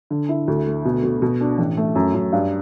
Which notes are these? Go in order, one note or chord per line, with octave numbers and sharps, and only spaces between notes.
D3
E4
D2
A3
B2
B2
B2
D4
A1
A3
F#2
F#2
G2